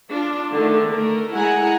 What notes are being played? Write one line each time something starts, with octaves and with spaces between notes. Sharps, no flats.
D4 F4
D3 D#3 A3
A3 A#4
G#3 E4 F#5 G#5 A#5